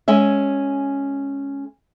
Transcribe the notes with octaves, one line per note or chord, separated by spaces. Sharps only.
G#3 C#4 E5